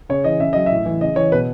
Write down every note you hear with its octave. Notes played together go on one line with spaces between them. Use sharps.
C#3 C#5
E3 D#5
C#3 E5
F#3 D#5
A2 E5
E3
C#3 D#5
E3 C#5
B2 B4